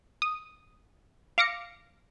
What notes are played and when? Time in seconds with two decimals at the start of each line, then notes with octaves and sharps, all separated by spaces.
0.22 D#6
1.38 F5 D6 A#6 C#7